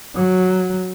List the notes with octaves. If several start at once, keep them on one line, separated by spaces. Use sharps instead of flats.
F#3